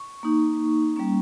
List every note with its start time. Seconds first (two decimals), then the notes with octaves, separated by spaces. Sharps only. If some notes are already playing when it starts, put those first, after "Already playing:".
Already playing: C#6
0.23 A#3 D#4
0.96 G3 A#3 C#4